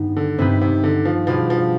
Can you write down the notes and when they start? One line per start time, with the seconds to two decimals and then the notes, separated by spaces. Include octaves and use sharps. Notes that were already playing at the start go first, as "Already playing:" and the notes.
Already playing: G2 D#3 B3 D#4 B4
0.16 D3
0.39 G2 C3 D#3 B3 D#4 B4
0.61 C3
0.84 D3
1.05 F3
1.27 B2 F3 G3 D4 F4 G#4
1.50 F3